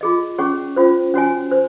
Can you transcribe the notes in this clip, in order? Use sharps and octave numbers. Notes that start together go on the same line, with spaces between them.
F4 G#4 D#5
C#4 G#4 C#5 F#5 C#6
C#4 F4 C5
C#4 F#4 C#5 G#5
C5